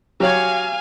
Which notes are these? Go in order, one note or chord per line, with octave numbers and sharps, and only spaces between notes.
F#3 G4 C#5 F5 G#5